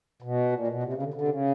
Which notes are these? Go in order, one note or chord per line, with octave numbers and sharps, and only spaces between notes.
B2
A#2
B2
C3
C#3
D3
D3
C3
C#3